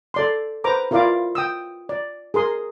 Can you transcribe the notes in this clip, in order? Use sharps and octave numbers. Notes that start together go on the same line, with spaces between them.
A4 D5 C6
B4 C5 A#5 D6
E4 F4 A#4 D5 F5 D6
G5 D#6 E6
D5
G#4 A#4 C6 D#6